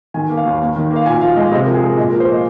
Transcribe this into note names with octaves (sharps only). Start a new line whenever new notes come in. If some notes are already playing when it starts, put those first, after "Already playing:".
D#3 G#5
A#3
F5
D#2
D#2
D#3
A#3
F5
A#2 G#5
F3 F5
G#3 D#5
C3 D#5
A#4
F3
G#4
G#3 A#4
A#2 D#5
A#4
F3
C5
A#3 D#5